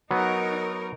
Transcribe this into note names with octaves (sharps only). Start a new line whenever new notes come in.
F#3 B3 D#4 A#4 C#5